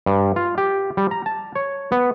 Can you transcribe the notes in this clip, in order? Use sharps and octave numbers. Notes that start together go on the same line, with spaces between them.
G2
F4
G4
G3
A#5
A5
C#5
B3